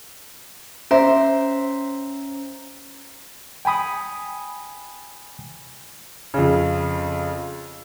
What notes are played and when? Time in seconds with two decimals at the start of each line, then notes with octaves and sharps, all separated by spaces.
0.91 C#4 C5 E5 A#5
3.65 G5 G#5 B5 D#6
6.34 F2 C#3